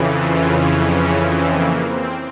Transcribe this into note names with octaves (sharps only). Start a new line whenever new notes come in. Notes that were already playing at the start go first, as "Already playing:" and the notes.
Already playing: F2 C#3 E3
F4
C#4
C#4
C4
A#3
C4